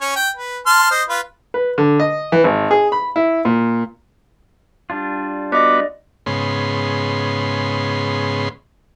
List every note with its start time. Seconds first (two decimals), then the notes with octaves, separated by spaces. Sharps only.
0.01 C#4 C#5
0.16 G5
0.37 B4
0.66 A5 C6 F6
0.91 C5 D#5
1.09 F4 B4
1.54 B4
1.78 D3
2.00 D#5
2.32 E3
2.44 G#1
2.71 G#4
2.92 B5
3.16 E4
3.45 A#2
4.90 G3 D4 F4
5.52 B3 F#4 D5 D#5 D6
6.26 G#2 C#3 B3 C6